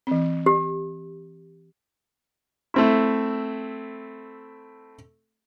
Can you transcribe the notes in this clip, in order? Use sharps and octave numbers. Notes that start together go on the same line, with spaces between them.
E3 C4
G4
A3 C4 E4